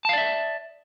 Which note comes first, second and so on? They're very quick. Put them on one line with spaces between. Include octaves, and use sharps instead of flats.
A5 F5 D5 E5